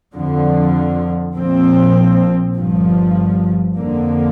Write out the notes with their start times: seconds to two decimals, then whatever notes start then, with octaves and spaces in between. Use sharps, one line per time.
0.15 F2 D3 F3
1.35 A#1 A#2 F3 C4
2.55 G1 G2 F3
3.76 F2 D3 A#3